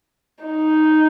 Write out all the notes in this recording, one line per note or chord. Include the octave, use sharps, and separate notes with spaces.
D#4